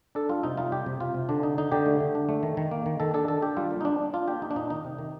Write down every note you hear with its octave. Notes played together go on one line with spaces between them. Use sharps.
D4 A4
G3 F4
C3 D#4
G3 F4
C3 G4
C3
C3 F4
C3
D3 D4
D4 D#4
D3 D#4
D3 G4
A3
D3
D4
A3
D#3
D#3
A#3
D#3
D#3 A4
D4 A4
D#3 A4
D4 G4
G3 F4
A#3
D#4
D4
D4
D4 F4
A#3 G4
A#3 D#4
D4
A#2 D#4
D#3 D#4
C3
D#3